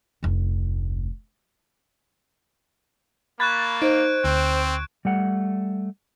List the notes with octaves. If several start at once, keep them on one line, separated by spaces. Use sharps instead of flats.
F1 D2
A#3 B5 C#6 F#6 G#6 A6
D#4 C5 D7
D2 C4
G3 A3 F#5